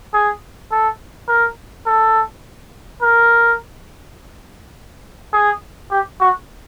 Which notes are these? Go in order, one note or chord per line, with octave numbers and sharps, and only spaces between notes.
G#4
A4
A#4
A4
A#4
G#4
G4
F#4